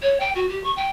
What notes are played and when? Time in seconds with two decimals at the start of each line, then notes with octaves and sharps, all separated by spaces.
0.02 C#5
0.20 G5
0.35 F#4
0.50 G4
0.64 C#6
0.77 G5